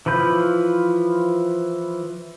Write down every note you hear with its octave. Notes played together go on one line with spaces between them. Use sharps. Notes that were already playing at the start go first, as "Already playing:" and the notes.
E3 F3 B4 G6